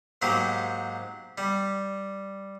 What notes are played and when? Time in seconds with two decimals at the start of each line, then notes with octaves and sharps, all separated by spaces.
0.22 G#2 F#3 A#3 G4
1.38 G3